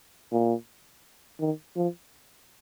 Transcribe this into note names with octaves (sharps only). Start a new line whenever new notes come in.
A#2
D#3
F3